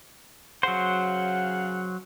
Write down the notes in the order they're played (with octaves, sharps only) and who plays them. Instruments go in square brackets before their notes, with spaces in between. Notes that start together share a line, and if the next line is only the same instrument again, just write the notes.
[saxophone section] C#3 F5 F#5 [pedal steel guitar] F#3 C5